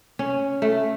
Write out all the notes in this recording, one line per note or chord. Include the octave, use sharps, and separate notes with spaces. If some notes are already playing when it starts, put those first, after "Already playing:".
C#4
A3